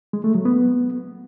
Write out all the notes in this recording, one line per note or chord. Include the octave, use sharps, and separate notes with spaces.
G#3
A3
F#3
B3